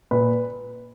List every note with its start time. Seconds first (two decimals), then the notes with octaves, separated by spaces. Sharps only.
0.11 A#2 B4